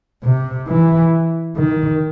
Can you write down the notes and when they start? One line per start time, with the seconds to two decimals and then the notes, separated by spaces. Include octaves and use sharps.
0.23 C3
0.67 E3
1.56 D#3